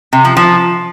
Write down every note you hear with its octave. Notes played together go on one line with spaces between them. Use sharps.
C3
F3
F3